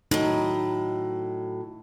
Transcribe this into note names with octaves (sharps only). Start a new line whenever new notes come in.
A2 F#3 D#4